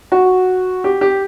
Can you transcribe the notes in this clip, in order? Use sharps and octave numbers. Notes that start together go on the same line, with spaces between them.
F#4
G4
G4